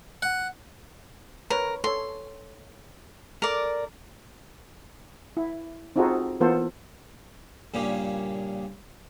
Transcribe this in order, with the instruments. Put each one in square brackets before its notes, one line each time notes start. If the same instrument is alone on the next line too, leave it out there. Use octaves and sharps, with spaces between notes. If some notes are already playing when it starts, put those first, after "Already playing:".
[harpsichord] F#5
[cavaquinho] A#4 [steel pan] B4 C#5
[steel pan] A4 C#5 [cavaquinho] C6
[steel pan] A4 [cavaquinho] A#4 D5
[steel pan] E4
C4 D#4 F4 F#4 G#4 A4
E3 A#3 B3 F4 A4 C5
[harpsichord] G2 A#2 C#3 G3